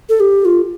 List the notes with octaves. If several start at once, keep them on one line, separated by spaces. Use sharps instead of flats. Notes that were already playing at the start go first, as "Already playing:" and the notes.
A4
G4
F4